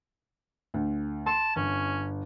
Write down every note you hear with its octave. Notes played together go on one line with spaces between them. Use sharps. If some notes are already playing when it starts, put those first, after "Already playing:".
D2
A5 C6
G1 C#4